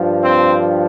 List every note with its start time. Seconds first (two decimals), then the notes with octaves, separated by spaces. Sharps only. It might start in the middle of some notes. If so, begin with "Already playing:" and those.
Already playing: G2 F3
0.21 C4